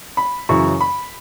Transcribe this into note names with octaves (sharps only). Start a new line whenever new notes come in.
B5
F#2 C#3 E3 C#6
B5